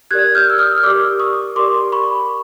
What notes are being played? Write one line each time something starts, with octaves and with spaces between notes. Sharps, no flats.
G4 A#4 D5 F#6 G#6
F6 G6
E6
D#6 F6
F6
G4 A#4 D5 D6 E6
C#6 D#6
G4 A#4 D5 C6 D6
B5 C#6